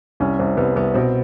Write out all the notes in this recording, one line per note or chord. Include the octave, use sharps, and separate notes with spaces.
C2 C#4
C2 C4
C2 B3
C2 B3
B2 C4